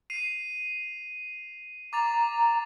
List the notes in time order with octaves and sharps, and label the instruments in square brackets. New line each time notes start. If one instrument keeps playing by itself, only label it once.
[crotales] C7 D#7 F7
[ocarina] A#5 [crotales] D6 A6 F7